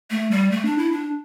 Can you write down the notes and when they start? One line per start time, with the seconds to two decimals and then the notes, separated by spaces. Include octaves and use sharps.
0.11 A3
0.31 G3
0.51 A3
0.65 D4
0.78 E4
0.92 D4